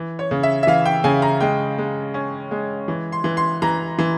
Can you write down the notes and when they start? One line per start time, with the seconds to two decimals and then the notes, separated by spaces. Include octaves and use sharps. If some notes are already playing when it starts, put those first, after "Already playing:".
Already playing: E3
0.19 C#5
0.31 C#3
0.43 E5
0.63 E5
0.67 E3 F5
0.86 G5
1.04 C#3 G#5
1.22 A#5
1.40 G#3 G5
1.78 G#3
2.14 C#4
2.51 G#3
2.88 E3
3.12 C6
3.24 E3
3.37 C6
3.62 E3 A#5
3.99 E3